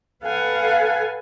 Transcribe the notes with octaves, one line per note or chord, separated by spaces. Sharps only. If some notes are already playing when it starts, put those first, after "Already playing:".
A4 B4 F5 F#5 G#5